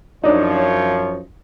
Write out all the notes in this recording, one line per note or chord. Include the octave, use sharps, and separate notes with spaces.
F#2 F3 D4 D#4 C#5